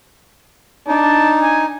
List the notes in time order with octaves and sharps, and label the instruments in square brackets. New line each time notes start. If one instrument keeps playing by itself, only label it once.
[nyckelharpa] D4 [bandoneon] D#4 [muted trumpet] A5
[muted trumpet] G#5